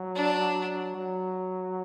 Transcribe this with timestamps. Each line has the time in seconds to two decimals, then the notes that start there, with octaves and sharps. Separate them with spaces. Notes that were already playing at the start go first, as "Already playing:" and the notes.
Already playing: F#3
0.15 D4
0.96 F#3